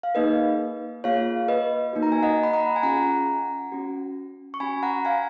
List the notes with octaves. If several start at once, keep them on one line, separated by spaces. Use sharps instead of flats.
F5
A#3 D#4 G#4 B4 D#5
A#3 F4 G#4 C#5 F5
B4 D#5
A#3 D#4 F#4
A#5
G#5
D#5 F#5
B5
F#5 A#5
G#5
C#4 F4 G#4 F#5 A#5
C#4 F#4
C#6
C#4 F#4 G#5 B5
F#5 A#5
F5 G#5